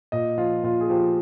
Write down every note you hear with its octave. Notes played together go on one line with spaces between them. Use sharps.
A#2 D#5
F3 F4
A#2 F4
G#4
F3 G4